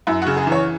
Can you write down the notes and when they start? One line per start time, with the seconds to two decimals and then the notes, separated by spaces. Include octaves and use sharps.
0.07 F#2 E4
0.22 C#3 F#4
0.37 G#4
0.47 E3 C#5